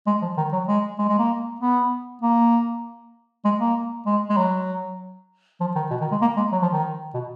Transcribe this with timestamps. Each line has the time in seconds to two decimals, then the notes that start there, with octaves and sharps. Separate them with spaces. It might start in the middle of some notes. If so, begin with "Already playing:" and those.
0.07 G#3
0.22 F3
0.37 D#3
0.53 F#3
0.68 G#3
0.99 G#3
1.09 G#3
1.19 A#3
1.60 B3
2.22 A#3
3.45 G#3
3.60 A#3
4.06 G#3
4.29 G#3
4.37 F#3
5.60 F3
5.75 D#3
5.91 B2
6.01 D#3
6.12 G#3
6.22 A#3
6.37 G#3
6.52 F#3
6.62 F3
6.72 D#3
7.14 B2